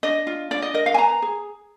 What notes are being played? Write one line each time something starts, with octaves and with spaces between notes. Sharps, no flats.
D4 D#5
F4
D4 D5
D#5
A#4 D#5
F5
G#5
B4 A#5
G#4